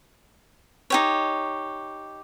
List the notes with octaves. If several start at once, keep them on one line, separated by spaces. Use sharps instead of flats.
D#4 G4 C#5